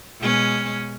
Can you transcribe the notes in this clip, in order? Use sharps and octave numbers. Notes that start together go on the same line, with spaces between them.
B2 G#3 C#4